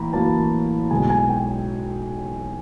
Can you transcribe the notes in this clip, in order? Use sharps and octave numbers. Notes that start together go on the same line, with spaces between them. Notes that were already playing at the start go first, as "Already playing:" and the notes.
Already playing: A1 A2 A#3 A#5 B5
A1 A2 F#3 A#3 A5
B1 B2 G#3 G#5
G#5
G5